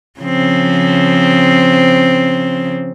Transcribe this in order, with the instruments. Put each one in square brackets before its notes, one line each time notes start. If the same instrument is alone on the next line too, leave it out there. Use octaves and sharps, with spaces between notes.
[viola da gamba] C#3 F3 C4